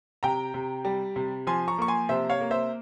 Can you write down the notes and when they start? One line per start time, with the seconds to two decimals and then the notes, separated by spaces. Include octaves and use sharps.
0.23 C3 G5 A#5
0.54 C3
0.85 G3
1.16 C3
1.47 F3 G#5 C6
1.68 A#5 C#6
1.78 A#3 C#6
1.88 G#5 C6
2.09 C3 C5 E5
2.29 C#5 F5
2.41 A#3
2.51 C5 E5